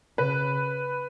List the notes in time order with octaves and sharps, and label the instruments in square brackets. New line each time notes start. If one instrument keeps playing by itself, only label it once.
[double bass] C#3 [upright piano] B4